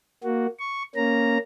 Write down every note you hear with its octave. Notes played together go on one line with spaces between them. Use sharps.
A#3 F#4
C#6
A#3 C#4 A#5